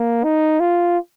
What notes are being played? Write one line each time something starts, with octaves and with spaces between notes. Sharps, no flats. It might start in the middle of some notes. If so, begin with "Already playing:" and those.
Already playing: A#3
D#4
F4